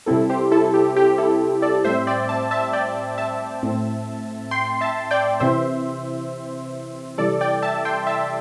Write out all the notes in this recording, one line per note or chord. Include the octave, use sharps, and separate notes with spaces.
C3 G3 C4 E4 A4
G4 C5
E4 A4
G4
G4
E4 A4
A4 D5
A2 G3 C4 C5 E5
D5 G5
E5 A5
E5 A5
D5 G5
E5 A5
A2 A3 C4
G5 C6
E5 A5
D5 G5
C3 E3 C4 C5 E5
C3 E3 G3 A4 D5
D5 G5
E5 A5
G5 C6
E5 A5